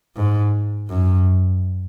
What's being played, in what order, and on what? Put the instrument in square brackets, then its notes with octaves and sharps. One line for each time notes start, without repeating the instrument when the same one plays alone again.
[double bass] G#2
F#2